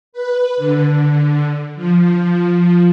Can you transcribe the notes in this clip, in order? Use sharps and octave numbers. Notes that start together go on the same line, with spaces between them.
B4
D3
F3